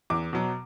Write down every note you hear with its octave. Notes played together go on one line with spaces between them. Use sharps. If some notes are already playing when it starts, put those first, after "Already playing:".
E2 D6
B2 F#3